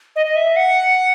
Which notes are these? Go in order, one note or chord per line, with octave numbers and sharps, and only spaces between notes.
D#5
D#5
E5
F#5